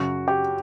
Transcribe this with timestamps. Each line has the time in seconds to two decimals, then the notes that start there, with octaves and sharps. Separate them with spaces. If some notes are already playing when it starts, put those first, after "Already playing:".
Already playing: F#2 C#3 F#3 F#4
0.28 G4